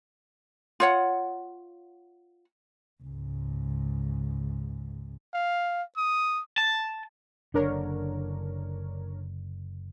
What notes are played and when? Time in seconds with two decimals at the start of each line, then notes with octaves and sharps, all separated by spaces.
0.80 F4 C#5 F#5
3.03 C#2 G#2
5.34 F5
5.97 D#6
6.58 A5
7.54 F#1 D3 D4 A#4 C#5